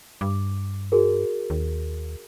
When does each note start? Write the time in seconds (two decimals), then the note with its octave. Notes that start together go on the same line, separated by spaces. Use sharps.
0.21 G2 D6
0.92 F#4 G#4 A#4
1.50 D#2